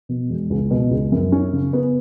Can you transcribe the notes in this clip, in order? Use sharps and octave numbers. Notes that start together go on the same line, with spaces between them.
B2
E1
C#2
B2
C#2
F#2
C#4
C#3
B3